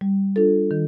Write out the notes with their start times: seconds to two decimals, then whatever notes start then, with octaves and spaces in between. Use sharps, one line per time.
0.01 G3
0.36 D4 F4 A4
0.71 D#3